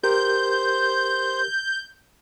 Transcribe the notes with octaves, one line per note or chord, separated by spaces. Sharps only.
G4 A#4 C5 G6